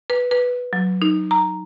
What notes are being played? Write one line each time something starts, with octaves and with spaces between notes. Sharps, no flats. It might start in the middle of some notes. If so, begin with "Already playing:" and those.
B4
B4
F#3
D#4
A#5